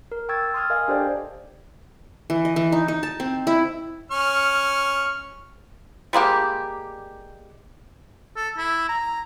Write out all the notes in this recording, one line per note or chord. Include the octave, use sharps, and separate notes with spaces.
A#4
G5 C#6 E6 G#6 A6
C6 D#6 F6 G#6
A#4 D#5 F5 G#5
D4 G4 A4 C5 D5 G5
E3
D#5
E3
D#4
D#4
A5
C4
E4
C#4 C#6 F6
G3 G#3 A#3 G4
A4
E4
A#5